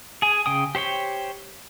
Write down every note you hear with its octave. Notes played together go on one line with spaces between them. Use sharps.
G#4 G#5
C#3 G5 D#6
G4 C5 C#5 G5